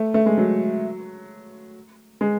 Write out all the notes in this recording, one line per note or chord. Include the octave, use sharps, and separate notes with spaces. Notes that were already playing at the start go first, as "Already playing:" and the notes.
Already playing: A3
A3
G#3
F#3
G#3